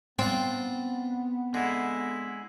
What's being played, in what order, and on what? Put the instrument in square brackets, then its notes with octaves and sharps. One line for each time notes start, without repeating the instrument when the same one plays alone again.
[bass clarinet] B3 [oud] C4 [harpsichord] D4 F4 C5
[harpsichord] D3 [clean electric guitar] G#3 E4